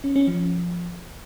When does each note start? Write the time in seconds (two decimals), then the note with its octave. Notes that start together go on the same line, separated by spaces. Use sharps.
0.04 C#4
0.16 C#4
0.27 F3